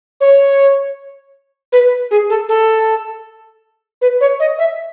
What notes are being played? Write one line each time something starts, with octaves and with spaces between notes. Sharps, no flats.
C#5
B4
G#4
A4
A4
B4
C#5
D#5
E5